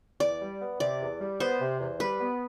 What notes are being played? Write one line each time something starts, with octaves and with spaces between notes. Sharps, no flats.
E2 D5
G3
B3
C3 D5
E2
G3
B3 C5
C3
E2
G3 B4
B3